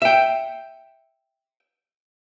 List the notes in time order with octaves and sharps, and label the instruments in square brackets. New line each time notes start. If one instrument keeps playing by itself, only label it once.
[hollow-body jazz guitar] E5 G5